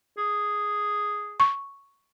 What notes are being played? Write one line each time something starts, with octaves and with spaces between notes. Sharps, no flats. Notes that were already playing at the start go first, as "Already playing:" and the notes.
G#4
C#6